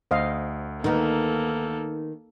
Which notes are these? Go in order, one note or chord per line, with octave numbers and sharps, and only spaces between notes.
D2 C5 D#5 F5
D#3 A#3 B3 D#4 A4 A#4